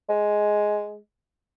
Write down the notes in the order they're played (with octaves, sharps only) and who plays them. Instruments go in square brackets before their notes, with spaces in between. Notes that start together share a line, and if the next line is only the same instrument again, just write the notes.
[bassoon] G#3